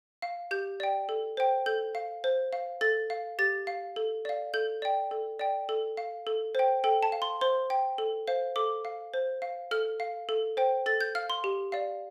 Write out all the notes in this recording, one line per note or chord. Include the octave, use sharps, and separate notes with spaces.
F5
G4 G6
D5 G5
A4
C5 G5
A4 G6
F5
C5
F5
A4 A6
F5
G4 A6
F5
A4
D5 F5
A4 G6
D5 G5
A4
D5 G5
A4
F5
A4
C5 G5
A4 G5
A5
F5
C6
C5 C6
G5
A4
C5 F5
A4 D6
F5
C5
F5
A4 F6
F5
A4
C5 G5
A4 A6
G6
F5 F6
C6
G4
D5 F5